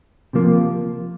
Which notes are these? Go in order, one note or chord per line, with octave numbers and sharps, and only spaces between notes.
C3 F3 A#3